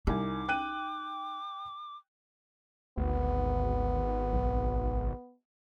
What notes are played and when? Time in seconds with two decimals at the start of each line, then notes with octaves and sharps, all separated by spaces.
0.07 C2 D#4 G#5 D6
0.48 G5 F#6 D#7
2.98 G#1 D2 B3
4.33 B1